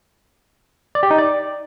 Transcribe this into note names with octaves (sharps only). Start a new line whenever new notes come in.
D5
G4
D#4
D5